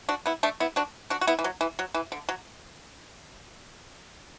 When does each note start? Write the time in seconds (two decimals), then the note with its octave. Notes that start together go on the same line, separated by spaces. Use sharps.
0.09 D4 F#4
0.26 B3 E4
0.43 A3 D4
0.60 B3 E4
0.76 D4 F#4
1.10 D4 F#4
1.21 F#4
1.27 B3 E4
1.39 E3
1.44 F#3
1.61 E3
1.79 F#3
1.94 E3
2.12 D3
2.29 F#3